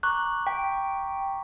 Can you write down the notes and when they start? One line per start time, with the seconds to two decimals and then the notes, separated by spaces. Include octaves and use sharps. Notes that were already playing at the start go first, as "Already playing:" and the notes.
0.03 A#5 C#6 D6 F#6
0.47 G5 B6